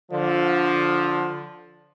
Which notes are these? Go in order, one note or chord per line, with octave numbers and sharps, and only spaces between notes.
D3 F3